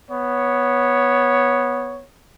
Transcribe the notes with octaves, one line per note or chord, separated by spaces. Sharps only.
B3 C#5